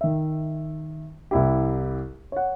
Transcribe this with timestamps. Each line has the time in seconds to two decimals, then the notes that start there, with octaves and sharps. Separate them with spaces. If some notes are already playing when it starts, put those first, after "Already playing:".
0.01 D#3 E5
1.31 C2 E4 G4
2.32 C#5 F#5